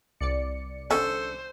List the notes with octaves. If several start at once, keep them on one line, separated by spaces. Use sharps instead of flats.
C2 D5 C#7
D3 C#4 A4 C5